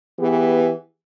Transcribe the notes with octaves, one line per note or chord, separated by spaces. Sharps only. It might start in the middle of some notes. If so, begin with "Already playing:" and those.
E3 B3 G4 G#4